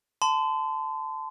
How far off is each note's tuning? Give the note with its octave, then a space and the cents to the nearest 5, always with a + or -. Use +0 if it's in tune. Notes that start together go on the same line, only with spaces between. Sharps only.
A5 -5 C6 -35